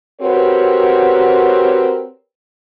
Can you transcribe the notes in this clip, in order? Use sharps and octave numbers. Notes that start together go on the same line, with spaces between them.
C4 F#4 G4 A#4 B4 C#5